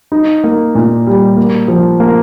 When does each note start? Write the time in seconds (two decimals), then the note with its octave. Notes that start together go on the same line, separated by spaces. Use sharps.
0.12 D#4
0.44 A#3
0.75 A#2
1.07 G3
1.37 A#3
1.68 F3
2.00 A#3